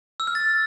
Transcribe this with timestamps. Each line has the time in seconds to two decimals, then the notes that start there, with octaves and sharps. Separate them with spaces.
0.20 E6
0.27 F6
0.35 A6